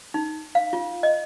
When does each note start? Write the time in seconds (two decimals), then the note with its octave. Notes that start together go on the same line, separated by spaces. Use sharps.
0.14 D#4
0.55 F5
0.73 F4
1.03 D#5